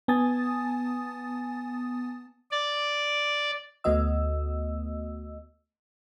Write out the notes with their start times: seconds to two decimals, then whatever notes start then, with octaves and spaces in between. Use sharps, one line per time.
0.08 B3 G#5 A5 D#6 A6
2.51 D5
3.84 D2 A3 B3 F#4 D#5 E6